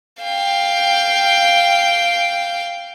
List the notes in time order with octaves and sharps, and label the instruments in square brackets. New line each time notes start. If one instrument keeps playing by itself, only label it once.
[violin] F5 G5